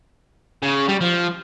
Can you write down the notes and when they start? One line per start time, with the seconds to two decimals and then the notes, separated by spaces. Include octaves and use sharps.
0.62 C#3
0.88 G3
1.01 F3